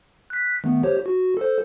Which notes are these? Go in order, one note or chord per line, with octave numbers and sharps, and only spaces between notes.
F#6 B6
D#3 A3 B3
G4 C5 C#5
F#4
A4 C5